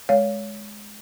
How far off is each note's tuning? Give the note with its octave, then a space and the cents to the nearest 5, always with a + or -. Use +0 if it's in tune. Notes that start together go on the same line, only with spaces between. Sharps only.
G#3 +15 C#5 +25 F5 +0